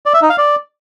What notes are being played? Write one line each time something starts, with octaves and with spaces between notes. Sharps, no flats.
D5
E5
D#4
F5
D5